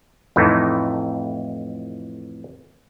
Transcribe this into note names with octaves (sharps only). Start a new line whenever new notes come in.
F2 A2 E3 A3 D#4